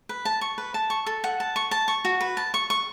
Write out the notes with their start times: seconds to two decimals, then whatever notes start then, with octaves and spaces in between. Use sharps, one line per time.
0.09 B4
0.25 A5
0.41 C#6
0.58 B4
0.74 A5
0.90 C#6
1.07 A4
1.24 F#5
1.40 A5
1.56 C#6
1.71 A5
1.88 C#6
2.05 F#4
2.21 B4
2.37 A5
2.54 C#6
2.70 C#6